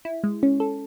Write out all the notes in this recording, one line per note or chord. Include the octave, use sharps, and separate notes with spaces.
E4
G#3
C#4
A4